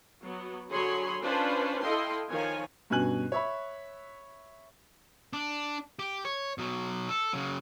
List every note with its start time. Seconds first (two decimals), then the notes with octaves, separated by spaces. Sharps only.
0.23 F#3 B3
0.69 D3 F#3 G#4 C#5 B5 C6
1.21 C#4 D4 F4 B4 C5
1.81 E4 A4 D#5 F5 G5 C6
2.28 D#3 F3 C#5 G#5
2.90 G2 B2 C#4 G#5 F#6 F#7
3.32 C#5 E5 B5
5.33 D4
5.99 G4
6.25 C#5
6.58 B2 F#3
7.09 A4
7.33 C#3 F#3